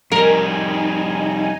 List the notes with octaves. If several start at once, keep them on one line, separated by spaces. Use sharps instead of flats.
F2 G3 D#4 A#4 G#5